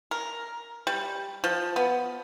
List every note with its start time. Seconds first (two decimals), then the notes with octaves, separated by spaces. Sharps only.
0.11 A#4
0.87 G3
1.44 F3
1.76 B3